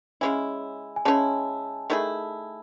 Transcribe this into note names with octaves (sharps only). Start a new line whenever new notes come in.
C#3 G#3 C#4 E4 G#5
G#5
C#3 G#3 C#4 E4 A5
D#3 A3 E4 G#4